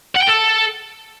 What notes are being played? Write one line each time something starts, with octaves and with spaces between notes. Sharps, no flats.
F#5
G5
A4